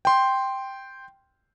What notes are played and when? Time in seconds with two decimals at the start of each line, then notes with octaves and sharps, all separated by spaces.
0.05 G5 C6